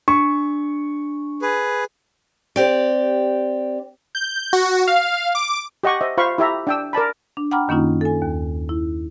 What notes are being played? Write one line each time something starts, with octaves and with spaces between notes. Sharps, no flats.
D4 C#6
G#4 B4
C4 G4 D5
G6
F#4
F5
D6
G4 D#5 F#5 C#6
C5 D#5 E5
F4 C5 F5 B5 C#6
E4 G4 E5 A#5
D4 G5 E6
A#4 D5 A5 B5
D4
F#5 G5 A#5 B5 D6 F6
F#2 D#3 A#3 C#4 D#4 F4
A4 G#5
D#2
E4